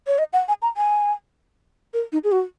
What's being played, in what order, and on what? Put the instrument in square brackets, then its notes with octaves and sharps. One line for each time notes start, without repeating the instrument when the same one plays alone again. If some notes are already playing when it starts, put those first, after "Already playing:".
[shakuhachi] C#5
D#5
F#5
G#5
A#5
G#5
A#4
D#4
G#4
F#4